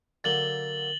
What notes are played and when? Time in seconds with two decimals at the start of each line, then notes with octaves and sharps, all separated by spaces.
0.24 D3 F#3 A#3 A6 F#7 G7